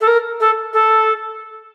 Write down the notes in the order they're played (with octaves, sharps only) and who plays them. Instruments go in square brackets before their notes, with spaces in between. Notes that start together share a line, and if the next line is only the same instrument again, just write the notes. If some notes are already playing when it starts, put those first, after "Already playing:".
[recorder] A4
A#4
A4
A4